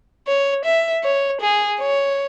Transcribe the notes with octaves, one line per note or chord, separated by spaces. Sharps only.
C#5
E5
C#5
G#4
C#5